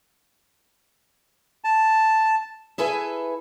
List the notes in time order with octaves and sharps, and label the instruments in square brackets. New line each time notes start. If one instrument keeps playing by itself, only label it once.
[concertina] A5
[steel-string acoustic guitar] E4 G#4 A4 B4 E5